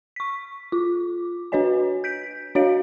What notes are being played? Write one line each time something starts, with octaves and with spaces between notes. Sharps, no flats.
C#6 B6
F4 D6
D4 F#4 B4 C#5 D#5 G#5
G6 B6 D7
D4 F#4 C#5 D#5 F5 D7